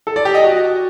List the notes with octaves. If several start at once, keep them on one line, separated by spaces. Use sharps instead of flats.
A4
D5
G4
D#5
F#4